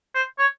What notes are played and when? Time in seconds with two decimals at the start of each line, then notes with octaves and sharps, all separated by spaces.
0.15 C5
0.39 C#5